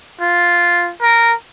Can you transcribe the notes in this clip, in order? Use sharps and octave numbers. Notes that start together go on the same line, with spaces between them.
F4
A#4